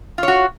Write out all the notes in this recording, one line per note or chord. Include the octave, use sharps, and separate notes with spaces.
F4 F#4 C#5